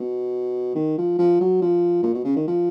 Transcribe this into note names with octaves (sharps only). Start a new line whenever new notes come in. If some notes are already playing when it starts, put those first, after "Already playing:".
Already playing: B2
D#3
F3
F3
F#3
F3
A#2
B2
C#3
D#3
F3